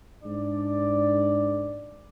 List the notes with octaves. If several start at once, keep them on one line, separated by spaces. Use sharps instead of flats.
G#2 D4 D5